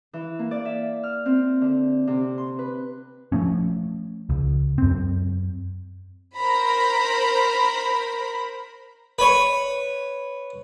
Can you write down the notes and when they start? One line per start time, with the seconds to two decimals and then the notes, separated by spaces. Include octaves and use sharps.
0.13 E3
0.39 A#3
0.51 D5
0.65 E5
1.03 F6
1.26 C4
1.61 D3
2.07 C3
2.38 C6
2.59 B4
3.32 F3 A3 C#4
4.29 C#2
4.78 F#2 C4
6.36 A#4 C5 A#5 B5
9.19 B4 C#5